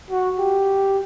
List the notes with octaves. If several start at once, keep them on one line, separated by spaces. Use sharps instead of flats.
F#4
G4